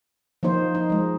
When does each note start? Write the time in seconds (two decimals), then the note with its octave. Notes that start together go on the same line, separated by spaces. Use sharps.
0.43 F3 A#3 D#4 C5
0.75 D#4
0.90 F3 G#3